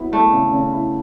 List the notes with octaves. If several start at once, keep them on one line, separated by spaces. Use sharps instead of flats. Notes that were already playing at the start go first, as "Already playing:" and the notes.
Already playing: F#3 B3 E4
A3 E4
C#3
C#3
E4